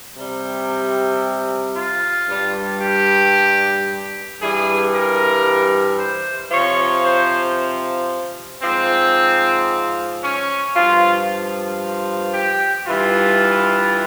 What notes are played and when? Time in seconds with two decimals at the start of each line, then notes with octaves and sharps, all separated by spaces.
0.17 C3 G3
1.75 F4
2.28 G2 G3
2.82 G4
4.41 G2 E3 G3 G#4
4.93 A#4
5.99 C5
6.52 C3 F3 C#5
7.05 C5
8.63 G#2 F3 C4
10.23 C#4
10.75 G2 F3 F4
12.34 G4
12.87 G2 E3 G3 F4